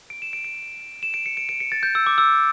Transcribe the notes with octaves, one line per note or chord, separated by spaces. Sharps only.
D7
E7
D7
D7
E7
D7
C#7
D7
D7
C#7
A6
G6
E6
D6
E6